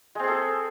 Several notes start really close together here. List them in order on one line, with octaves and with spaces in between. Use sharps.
G#3 C4 G#4 A4